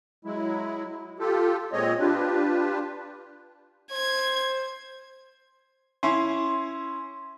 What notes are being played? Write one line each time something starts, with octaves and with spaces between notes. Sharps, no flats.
F#3 G#3 E4
F4 G4 A4
A#2 G#3 C4 C#5 D#5
D4 F4 G4 B4
C5 G#6
C#4 E4 C6